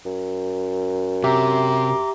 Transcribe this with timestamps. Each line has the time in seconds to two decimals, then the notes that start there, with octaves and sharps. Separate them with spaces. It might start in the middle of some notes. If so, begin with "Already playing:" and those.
0.05 F#2
1.24 C3 G4 E5 A#5 C6 D6